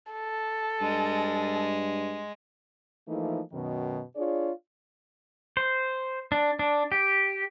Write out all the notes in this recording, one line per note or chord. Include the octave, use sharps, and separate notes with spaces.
A4
G2 G#3
E3 F3 A3 A#3 D#4
F#2 B2 D#3
D4 F4 G#4 C#5 D5
C5
D4
D4
G4